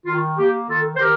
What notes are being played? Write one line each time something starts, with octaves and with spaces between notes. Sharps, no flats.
D#3 F4
A#3 G4
D#3 F4 A4
C5
D#3 G4 A#4